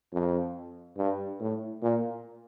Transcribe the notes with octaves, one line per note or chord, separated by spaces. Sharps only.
F2
G2
A2
A#2